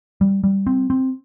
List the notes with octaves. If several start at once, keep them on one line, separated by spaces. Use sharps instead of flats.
G3
G3
C4
C4